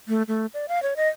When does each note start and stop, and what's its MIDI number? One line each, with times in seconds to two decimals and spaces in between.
0.08 0.23 57
0.28 0.46 57
0.54 0.66 74
0.68 0.81 77
0.83 0.94 73
0.96 1.08 75